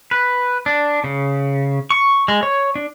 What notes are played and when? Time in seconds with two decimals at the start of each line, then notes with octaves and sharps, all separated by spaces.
0.11 B4
0.66 D4
1.04 C#3
1.90 C#6
2.28 G#3
2.43 C#5
2.76 D4